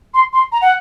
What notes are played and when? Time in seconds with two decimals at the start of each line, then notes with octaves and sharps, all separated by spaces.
0.14 C6
0.33 C6
0.52 A#5
0.62 F#5